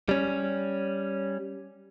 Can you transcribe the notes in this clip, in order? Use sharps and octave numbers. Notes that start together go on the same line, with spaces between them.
G3 C#4